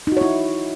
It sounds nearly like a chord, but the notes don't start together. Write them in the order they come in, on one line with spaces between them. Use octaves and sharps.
D#4 F#4 C#5 E4